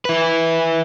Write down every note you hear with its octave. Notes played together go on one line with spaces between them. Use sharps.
E4 B4